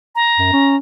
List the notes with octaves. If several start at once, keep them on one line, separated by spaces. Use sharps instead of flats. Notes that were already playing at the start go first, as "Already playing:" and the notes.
A#5
F#2
C#4